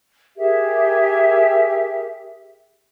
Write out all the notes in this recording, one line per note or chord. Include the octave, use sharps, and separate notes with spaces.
G4 G#4 A#4 E5